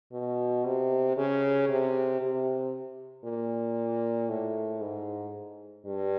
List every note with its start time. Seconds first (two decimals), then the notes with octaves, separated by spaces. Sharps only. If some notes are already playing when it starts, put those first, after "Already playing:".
0.12 B2
0.65 C3
1.17 C#3
1.69 C3
2.21 C3
3.24 A#2
4.29 A2
4.81 G#2
5.86 G2